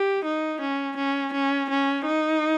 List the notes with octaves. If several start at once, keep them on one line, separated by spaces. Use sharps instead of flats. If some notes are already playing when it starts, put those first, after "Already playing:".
Already playing: G4
D#4
C#4
C#4
C#4
C#4
D#4